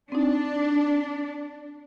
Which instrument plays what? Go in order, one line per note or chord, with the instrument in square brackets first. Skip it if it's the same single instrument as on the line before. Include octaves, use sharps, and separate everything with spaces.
[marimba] C4 D#4 [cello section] D4